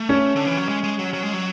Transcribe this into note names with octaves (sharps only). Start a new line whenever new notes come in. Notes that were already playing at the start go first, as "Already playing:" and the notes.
Already playing: A3
C#4
D3
E3
F#3
G#3
G#3
F#3
F#3
G#3
F#3